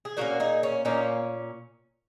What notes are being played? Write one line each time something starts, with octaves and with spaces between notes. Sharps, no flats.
G#4
A#2 A#3 C#4 F#4 A#4
D#4 G#4
C#4
A#2 A#3 C#4 D#4